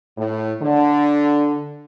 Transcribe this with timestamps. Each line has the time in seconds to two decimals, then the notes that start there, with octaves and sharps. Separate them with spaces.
0.18 A2
0.62 D3